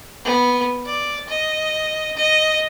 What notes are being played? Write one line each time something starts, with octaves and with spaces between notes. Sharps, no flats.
B3
D5
D#5
D#5